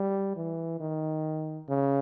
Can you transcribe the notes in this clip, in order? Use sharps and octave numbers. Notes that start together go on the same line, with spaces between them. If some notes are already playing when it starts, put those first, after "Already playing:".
Already playing: G3
E3
D#3
C#3